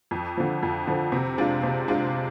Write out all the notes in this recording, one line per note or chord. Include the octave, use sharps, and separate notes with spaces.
F2
D3 F3
F2
D3 F3
C3
G#3 D4 F4
C3
G#3 D4 F4